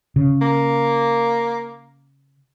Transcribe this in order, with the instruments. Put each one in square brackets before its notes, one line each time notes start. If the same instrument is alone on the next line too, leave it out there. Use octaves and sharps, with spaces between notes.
[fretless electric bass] C#3
[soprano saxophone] A#3